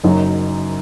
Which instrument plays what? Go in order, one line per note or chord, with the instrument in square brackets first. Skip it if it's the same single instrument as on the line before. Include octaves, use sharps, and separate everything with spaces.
[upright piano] F#1 F#2 F#3 D#4